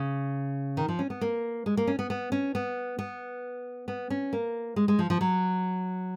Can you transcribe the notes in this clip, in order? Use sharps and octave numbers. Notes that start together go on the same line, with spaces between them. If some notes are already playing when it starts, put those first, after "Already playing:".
Already playing: C#3
D#3
F3
C#4
B3
A#3
G#3
A#3
C#4
B3
B3
C#4
B3
B3
B3
C#4
A#3
G#3
G#3
F3
F3
F#3